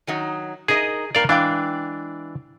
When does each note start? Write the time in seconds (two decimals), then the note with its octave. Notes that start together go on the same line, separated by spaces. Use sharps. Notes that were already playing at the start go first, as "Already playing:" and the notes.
0.07 D#3 F#3 D#4
0.68 D#4 G#4 A#4 D#5
1.15 G2 A#2 A#4 D5 F5 G5
1.29 E3 G#3 D4 F5 G5